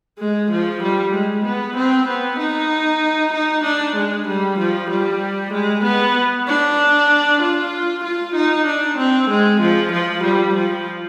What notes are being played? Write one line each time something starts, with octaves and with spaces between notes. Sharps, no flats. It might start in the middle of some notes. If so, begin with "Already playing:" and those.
G#3
F3
G3
G#3
B3
C4
B3
D#4
D#4
D4
G#3
G3
F3
G3
G#3
B3
D4
F4
F4
D#4
D4
C4
G#3
F3
F3
G3
F3